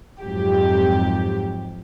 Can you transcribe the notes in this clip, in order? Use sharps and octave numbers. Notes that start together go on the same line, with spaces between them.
F2 G#2 F#3 G4